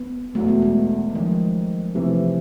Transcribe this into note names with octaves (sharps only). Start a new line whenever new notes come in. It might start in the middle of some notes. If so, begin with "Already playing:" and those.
Already playing: B3
E2 B2 F#3 A3
G#3
A3
F#3
D#3 F3 G#3 C#4
C3 E3 F3 A3